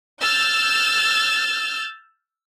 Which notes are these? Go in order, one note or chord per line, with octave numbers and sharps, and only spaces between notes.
E6 F6 G6 A6